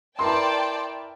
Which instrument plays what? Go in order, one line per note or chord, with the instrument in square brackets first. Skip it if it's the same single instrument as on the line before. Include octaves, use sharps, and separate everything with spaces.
[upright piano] E4 A#4 B4 [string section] D5 G5 A5 [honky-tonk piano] C6